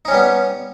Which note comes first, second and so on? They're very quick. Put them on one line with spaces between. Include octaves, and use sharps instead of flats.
D#4 C#4 G3 B3